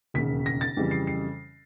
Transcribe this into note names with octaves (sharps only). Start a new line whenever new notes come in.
E1 D#2 C#3 B6
A#6
A6
F2 C#3 E3 G3
C7
C7